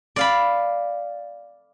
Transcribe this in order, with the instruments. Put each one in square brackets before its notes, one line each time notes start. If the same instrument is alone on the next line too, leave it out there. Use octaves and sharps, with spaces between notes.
[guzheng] D5 F5 B5